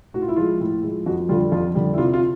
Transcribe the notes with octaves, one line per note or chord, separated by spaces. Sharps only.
A2 F#4
F4
E4
F3 G#3 F4
A2
F3 G#3
F2 F#4
D3 G3 F4
F2 F4
D3 G3
E4
C3 F4
F4